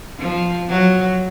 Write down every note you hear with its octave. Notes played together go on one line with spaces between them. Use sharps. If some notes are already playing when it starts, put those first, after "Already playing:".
F3
F#3